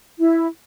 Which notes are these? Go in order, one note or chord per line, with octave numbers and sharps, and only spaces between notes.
E4